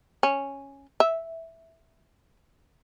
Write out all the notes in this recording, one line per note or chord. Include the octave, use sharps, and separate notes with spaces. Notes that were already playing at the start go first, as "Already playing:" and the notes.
C#4
E5